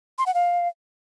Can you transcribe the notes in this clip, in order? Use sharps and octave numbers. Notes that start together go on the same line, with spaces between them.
C6
F#5
F5